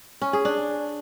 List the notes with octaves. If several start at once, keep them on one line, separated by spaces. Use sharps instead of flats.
C#4
G#4
D4